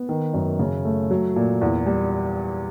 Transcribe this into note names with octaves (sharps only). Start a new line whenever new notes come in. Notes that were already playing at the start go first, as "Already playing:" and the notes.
Already playing: B3
D#3
F#2
C#3
A3
F#3
A#2
E2
G3